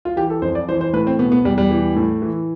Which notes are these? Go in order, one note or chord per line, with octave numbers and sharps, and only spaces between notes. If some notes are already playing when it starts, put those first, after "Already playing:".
F4
E3 G4
A4
F2 C5
D5
E3 C5
C5
A2 B4
C4
B2 B3
B3
E2 G3
G3
E3
A2
E3